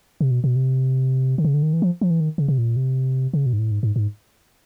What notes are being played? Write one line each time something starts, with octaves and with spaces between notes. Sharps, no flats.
C3
B2
B2
C3
D3
C#3
D3
D#3
E3
F3
F3
E3
D#3
C#3
C3
A#2
C3
C#3
B2
G#2
A2
G#2
G#2
G#2